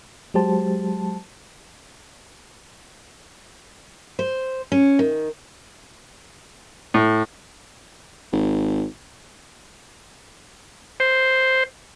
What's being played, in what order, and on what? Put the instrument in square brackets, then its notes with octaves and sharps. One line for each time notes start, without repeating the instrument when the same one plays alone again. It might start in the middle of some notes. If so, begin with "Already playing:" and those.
[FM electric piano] F#3 G#3 G4 C5 A5
[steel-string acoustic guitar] C5
C#4
D#3
[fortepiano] A2
[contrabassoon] G#1
[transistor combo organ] C5